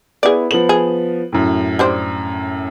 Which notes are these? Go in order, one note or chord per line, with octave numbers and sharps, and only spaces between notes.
B3 E4 G#4 D5
F3 B3 F#7
G#4
F#2 A2
G3 D4 C5